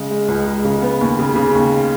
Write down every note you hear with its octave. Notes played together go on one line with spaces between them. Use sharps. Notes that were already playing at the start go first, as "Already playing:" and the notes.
Already playing: C#3 G#3
G#3
C#2
G#3
C#3
B3
D#2
C#3
C#3
D#2